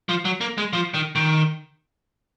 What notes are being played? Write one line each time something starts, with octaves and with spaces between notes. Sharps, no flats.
F3
F#3
A#3
G#3
F3
D#3
D#3